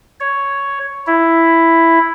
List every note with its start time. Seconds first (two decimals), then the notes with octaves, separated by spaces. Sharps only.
0.20 C#5
1.07 E4